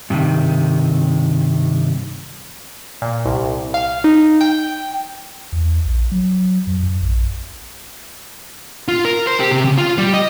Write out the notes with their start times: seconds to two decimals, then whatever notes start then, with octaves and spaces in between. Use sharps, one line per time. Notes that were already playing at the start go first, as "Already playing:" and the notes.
0.10 G2 C3 D#3
3.02 A#2
3.25 C2
3.74 F5
4.04 D#4
4.41 G5
5.52 E2
5.85 A#1
6.12 F#3
6.67 F#2
6.83 F#2
7.02 A#1
8.88 F4
9.05 A#4
9.27 C5
9.40 G4
9.51 C3
9.65 C#3
9.77 F4
9.98 G3
10.13 D#5